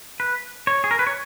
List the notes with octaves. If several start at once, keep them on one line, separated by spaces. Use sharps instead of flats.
B4
C#5
G#4
A#4
B4
C#5